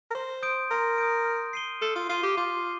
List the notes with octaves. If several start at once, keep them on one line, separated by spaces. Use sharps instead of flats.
A#4
C5 C6
D#6 G6 D7
A#4 C6
D#6 G6 D7
F6
C7 D#7 G7
A4 F6
F4
F4 C7 D#7 G7
G4
F4 D6